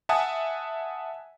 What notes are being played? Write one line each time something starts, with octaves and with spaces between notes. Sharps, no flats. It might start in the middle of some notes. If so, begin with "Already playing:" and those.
E5 F#5 G#5 A5 D#6